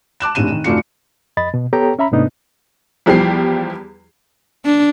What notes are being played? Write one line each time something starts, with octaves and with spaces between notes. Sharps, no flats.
A5 D6 F#6 E7
F1 A#1 A2 C3 D#7 E7
D#3
F1 A3 D4 F4 F#4 C#7
F2 D#5 B5 A6
B2
B3 G4 A4 C#5 G5 A#5
C#4 E5 A#5 B5
G#2 C3 A3 B3 D4 D#4
E2 F3 G3 G4 C7
D4